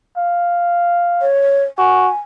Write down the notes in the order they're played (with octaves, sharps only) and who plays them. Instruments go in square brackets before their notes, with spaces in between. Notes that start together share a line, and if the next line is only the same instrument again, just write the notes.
[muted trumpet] F5
[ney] C#5
[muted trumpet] F#4 [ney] G#5